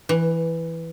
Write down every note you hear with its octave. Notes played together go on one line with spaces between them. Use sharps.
E3